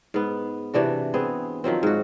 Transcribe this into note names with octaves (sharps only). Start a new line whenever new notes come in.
G#2 B3
C3 E3 D4 F#4
B3 C4 G#4
D#3 F3 F#3 C4
G#2 F#4